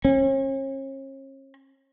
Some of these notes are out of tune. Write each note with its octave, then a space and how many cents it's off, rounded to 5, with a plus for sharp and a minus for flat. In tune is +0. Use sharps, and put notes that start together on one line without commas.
C#4 -40